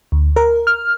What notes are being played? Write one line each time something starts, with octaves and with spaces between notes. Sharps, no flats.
D2
A#4
F6